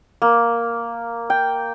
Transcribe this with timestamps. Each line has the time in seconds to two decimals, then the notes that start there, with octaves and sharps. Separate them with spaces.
0.22 A#3
1.30 G5